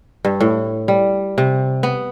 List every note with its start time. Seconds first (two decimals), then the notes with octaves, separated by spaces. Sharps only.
0.25 G2
0.40 A2
0.88 G3
1.38 C3
1.83 B3